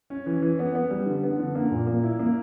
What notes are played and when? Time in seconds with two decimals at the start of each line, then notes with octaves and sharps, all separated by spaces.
0.10 C#4
0.26 E3
0.42 E3
0.59 B3
0.75 B3
0.90 G3
1.06 D3
1.24 B3
1.40 D3
1.55 A#3
1.71 A#2
1.87 A#3
2.03 E4
2.19 A#3